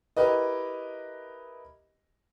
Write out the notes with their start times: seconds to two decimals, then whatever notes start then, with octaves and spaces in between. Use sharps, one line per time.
0.17 E4 G4 A#4 B4 D#5